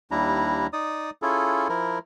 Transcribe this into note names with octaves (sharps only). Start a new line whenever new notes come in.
D#2 G3 D4 E4 A#5
D#4 D5 D#6
C#4 E4 F4 G#4 A4
F3 E4 A#4